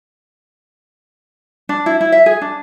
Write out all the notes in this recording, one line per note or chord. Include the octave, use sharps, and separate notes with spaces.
D4
E4
E4
E5
G#4
D4